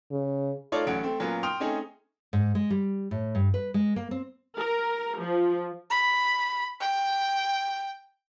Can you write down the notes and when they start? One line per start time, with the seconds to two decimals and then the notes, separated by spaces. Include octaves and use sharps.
0.11 C#3
0.72 A3 D#4 F4 A4 C#5 D5
0.87 A1 F#3 A3 C#4 F#5 D7
1.03 A3 C4
1.19 A#2 F#3 B3 C#4 F4 A#4
1.43 G5 C6 D#6 F6 F7
1.60 A3 C4 C#4 D#4 G#4
2.33 G#2
2.55 G#3
2.70 G3
3.11 A2
3.35 G2
3.54 B4
3.74 G#3
3.96 A#3
4.11 C4
4.57 A#4
5.18 F3
5.90 B5
6.80 G5